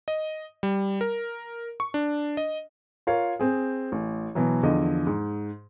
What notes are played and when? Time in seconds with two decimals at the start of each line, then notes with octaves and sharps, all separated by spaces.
0.08 D#5
0.63 G3
1.01 A#4
1.80 C#6
1.94 D4
2.37 D#5
3.07 F4 A#4 C#5 F5
3.40 C4 G#4
3.92 A1
4.35 B2 E3 F#3
4.63 E2 D3 F3 D#5
5.07 G#2